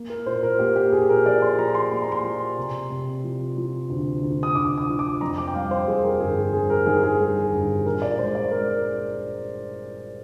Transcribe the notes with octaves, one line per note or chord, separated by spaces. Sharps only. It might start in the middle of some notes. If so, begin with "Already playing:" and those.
Already playing: A#3
A#4
A#2 C5
A#4
A#3 G4
G4
A#2 G#4
A#4
F3 D5
C6
F3 A#5
C6
A#3 C6
A#5
C6
F3
C3
C3
F3
F3
D2
D2
D#6
D2 D6
D#6
F3
D6
F2 A#5
D6
G5
G3 F5
C5
F2 G#4
A#4
G1 G#4
G3 G#4
A#4
D#3 G#4
G#4
G3
G1
A#2 A#4
D5
G#3 C5
D5
G#3 A#4